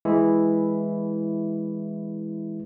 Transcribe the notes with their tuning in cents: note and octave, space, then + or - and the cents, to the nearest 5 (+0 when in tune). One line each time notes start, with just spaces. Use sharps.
E3 +0 G#3 +0 E4 -5